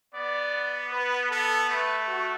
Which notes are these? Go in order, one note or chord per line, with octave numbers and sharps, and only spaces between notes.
B3 D5
B4
B3 A4
A3 B4
F#4